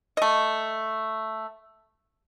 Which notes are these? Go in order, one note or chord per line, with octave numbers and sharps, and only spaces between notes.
A3 D#5